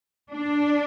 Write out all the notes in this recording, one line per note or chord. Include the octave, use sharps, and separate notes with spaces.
D4